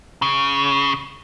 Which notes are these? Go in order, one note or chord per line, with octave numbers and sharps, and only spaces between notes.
C#3